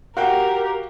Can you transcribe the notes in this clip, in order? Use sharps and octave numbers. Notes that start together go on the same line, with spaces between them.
F#4 G4 A#4 F5 G5